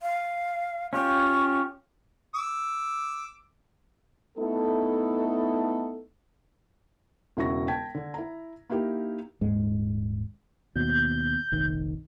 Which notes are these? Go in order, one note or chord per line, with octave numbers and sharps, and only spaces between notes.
F5
C#4 F4 G4 C#6
D6 E6
A3 B3 D#4 E4 A4
E1 C#3 E4 F#4 C#6 A#6
G5 A5 G#6 B6
D3 D4
E4 A#5
A#3 D#4 E4 G4 A#4
D#1 G#2 G#3
D#2 B2 G6
F1 A#1 D#3